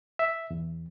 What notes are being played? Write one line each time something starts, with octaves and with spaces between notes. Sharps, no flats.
E5
E2